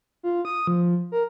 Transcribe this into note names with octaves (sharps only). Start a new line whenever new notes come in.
F4
D#6
F3
A#4